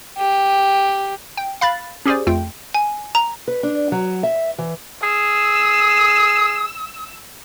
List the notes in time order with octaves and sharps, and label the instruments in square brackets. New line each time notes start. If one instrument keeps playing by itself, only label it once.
[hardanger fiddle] G4
[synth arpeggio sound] G5
F5 B5 F#6 A6
C#4 G4 G#4 C5 D5
F2 A3 F4 G5
[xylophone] G#5
A#5
[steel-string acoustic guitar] B4
D4
F#3
E5
E3
[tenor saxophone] G#4 [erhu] E6